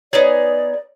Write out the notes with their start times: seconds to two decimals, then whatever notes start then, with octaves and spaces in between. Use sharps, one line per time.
0.13 B3 D#4 G#4 C#5 D5